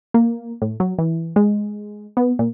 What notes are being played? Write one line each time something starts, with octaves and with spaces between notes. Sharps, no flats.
A#3
A2
F#3
E3
G#3
B3
A#2